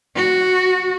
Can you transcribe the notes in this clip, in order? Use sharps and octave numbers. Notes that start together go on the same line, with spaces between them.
F#4